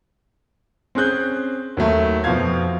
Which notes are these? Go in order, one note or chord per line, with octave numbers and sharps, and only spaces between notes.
C4 C#4 G#4 F#6 G6
D#2 F#3 A3
F2 B2 F3 C5 F5 G#6